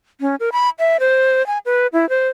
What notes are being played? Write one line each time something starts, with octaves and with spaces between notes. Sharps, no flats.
C#4
A#4
B5
E5
C5
G#5
B4
E4
C5